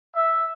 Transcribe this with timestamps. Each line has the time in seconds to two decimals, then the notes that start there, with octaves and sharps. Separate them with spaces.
0.15 E5